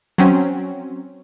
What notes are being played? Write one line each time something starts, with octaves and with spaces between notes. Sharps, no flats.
F#3 C4 C#4